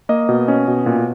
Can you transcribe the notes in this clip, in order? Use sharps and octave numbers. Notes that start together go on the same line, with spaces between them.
A#3 D#5
B2
C#4
B2
A#2